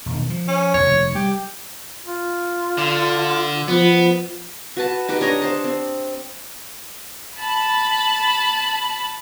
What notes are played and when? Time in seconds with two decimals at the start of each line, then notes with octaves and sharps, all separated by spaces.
0.06 E1 D#3
0.30 F3
0.48 C#4
0.74 F1 D#2 C#5
1.15 G3 G4
2.06 F4
2.78 D3
3.68 F3 B3
4.77 F#4 B4 A5
5.08 D#4 G4 B4
5.21 D4 C#5 D#5 A#5
5.42 C5 A5
5.64 C4
7.37 A5 B5